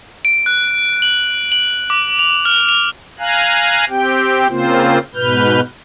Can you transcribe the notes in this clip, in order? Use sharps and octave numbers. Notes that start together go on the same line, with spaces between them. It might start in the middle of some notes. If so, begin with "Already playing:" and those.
D7
F#6
F#7
F#7
D6
F7
F6
F7
F5 G#5 A#5 F#6
C4 G4 G5
C#3 A#3 C4 F4 C5
G#2 B2 B4 F6 G6